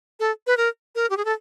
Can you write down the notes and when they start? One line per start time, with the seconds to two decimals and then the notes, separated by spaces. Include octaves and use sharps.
0.20 A4
0.47 B4
0.57 A#4
0.95 A#4
1.10 G4
1.17 G#4
1.25 A4